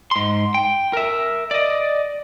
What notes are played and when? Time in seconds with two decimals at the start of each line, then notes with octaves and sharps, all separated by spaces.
0.11 G#2 C6
0.54 G5
0.93 A#4 E5
1.51 D5 D#5